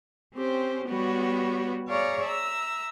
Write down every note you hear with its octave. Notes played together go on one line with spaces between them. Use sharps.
C4 C#4 G4 C5
G3 B3 F#4 G4 B4 C#5
G#4 C#5 D5 F5 A#5 C#6
E5 A#5 E6